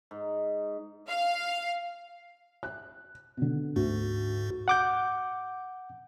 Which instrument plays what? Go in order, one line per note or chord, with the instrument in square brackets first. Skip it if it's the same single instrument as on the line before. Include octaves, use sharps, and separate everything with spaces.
[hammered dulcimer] G#2
[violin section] F5
[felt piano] F#6
B2 D3
[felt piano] D2 [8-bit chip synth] G#2 F#4
[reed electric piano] F#5 D6 G6